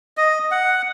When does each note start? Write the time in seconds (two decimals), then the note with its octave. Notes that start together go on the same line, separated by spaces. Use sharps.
0.17 D#5
0.51 F#5